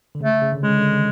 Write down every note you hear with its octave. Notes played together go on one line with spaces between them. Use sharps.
D3
C#3 A3
C#3
D3
C#3 G#3
D3
D#3